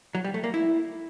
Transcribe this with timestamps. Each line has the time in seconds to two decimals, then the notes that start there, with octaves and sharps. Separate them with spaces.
0.15 F#3
0.24 G3
0.34 A3
0.44 A#3
0.54 E4